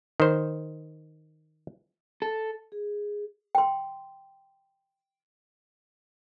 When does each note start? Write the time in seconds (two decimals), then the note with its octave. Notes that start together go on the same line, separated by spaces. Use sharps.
0.20 D#3 C5
2.22 A4
2.72 G#4
3.55 G5 C6